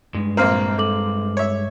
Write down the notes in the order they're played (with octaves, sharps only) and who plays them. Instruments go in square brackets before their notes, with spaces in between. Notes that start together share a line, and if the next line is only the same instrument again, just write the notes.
[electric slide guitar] G2 G#3
[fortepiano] A#1 A#3 C4 [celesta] A#5 F6 C7
[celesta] A4 D6 F#7
[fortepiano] C#5 E5